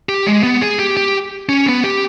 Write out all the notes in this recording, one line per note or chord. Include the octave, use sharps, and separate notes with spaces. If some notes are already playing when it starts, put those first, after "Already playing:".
G4
G#3
B3
G#4
G4
G4
C#4
B3
G4